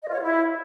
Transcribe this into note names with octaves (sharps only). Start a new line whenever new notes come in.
D#5
F4
C#5
F4
E4